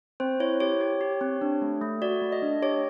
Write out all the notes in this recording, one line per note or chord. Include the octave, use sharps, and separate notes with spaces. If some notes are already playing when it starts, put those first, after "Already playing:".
C4 C5
E4 C#5
G4 C#5
G4
G4
C4
D4
A3
A3
F#4 D5
A3
D#5
D4
G4 C#5